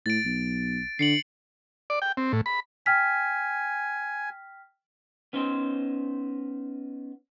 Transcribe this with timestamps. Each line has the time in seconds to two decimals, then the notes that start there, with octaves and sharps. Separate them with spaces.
0.06 A2 A6 D7
0.25 B1
0.99 D3 C7 C#7 F#7
1.90 D5
2.02 G5
2.17 C4
2.33 A2
2.46 B5
2.86 G5 G#5 F6 B6
5.33 B3 C#4 D#4 C5